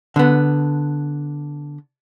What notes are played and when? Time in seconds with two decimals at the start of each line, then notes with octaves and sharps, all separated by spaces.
0.16 D3 B3